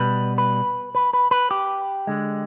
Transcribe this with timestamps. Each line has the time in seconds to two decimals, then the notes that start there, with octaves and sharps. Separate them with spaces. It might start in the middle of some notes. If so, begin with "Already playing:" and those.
Already playing: B2 G3 B4
0.38 B4
0.95 B4
1.13 B4
1.31 B4
1.51 G4
2.07 D3 G#3